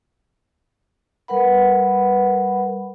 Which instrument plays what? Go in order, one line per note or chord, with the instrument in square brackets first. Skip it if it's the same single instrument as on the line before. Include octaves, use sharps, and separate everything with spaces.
[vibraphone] G3 A#4 B4 F#5 B5